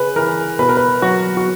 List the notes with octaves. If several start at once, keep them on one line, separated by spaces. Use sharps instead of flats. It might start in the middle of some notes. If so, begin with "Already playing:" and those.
Already playing: C#3 B4
E3 A#4
B2 B4
A#4
B4
F#3 F#4
F#4